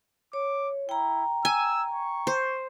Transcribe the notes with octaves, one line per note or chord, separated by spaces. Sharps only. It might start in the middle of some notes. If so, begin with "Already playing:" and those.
C#5 D6
E4 G5 A#5
G#5 E6
C#6
C5